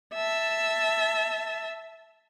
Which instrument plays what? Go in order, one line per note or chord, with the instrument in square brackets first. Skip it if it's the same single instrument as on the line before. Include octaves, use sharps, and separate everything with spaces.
[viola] E5 A5